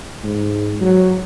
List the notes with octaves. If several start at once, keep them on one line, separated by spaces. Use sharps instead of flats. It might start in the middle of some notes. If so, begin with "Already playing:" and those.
G#2
F#3